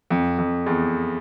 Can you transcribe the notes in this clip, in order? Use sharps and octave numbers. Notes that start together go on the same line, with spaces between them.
F2
F2
E2